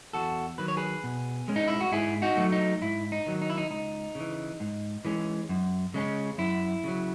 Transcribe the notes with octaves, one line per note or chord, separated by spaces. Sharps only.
E2 F#4 A4
D#3 F#3 B4
C#5
G#4 B4
B2
G#3 C#4
D#4
E4
F#4
G#2 E4 G#4
D#4 F#4
F#3 A3
D#4
G#2 E4
D#4
D#3 F#3
D#4
E4
D#4
C#2 D#4
C#3 E3
G#2
E3 G#3 C#4
F#2
C#3 G#3 C#4
F#2 E4
C#3 F#3